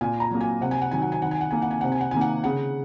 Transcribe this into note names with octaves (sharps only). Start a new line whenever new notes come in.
A#2 G#5
A#5
F#3 A#3
G#5
C3 F#5
G#5
F#5
D#3 F#3 G#5
F#5
G#5
D#3 F#5
G#5
F#5
A#3 G#5
F#5
G#5
C3 F#5
G#5
F#5
D#3 A#3 G#5
F#5
C#3 F#5